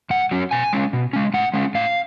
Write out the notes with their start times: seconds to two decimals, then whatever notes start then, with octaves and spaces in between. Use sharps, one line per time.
0.10 G#2 F#5
0.31 F#3 C#4
0.51 B2 G#5
0.73 G#3 C#4
0.93 B2
1.13 G#3 C#4
1.34 A2 F#5
1.53 G#3 C#4
1.75 A2 F5